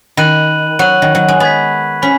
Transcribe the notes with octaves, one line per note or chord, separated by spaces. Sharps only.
D#3 B5 F#6 D#7 F#7
F#3 C#6 F#6 D#7 F#7
D#3
F#3
G#3
B3 B5 G#6 B6
C#4 B5 B6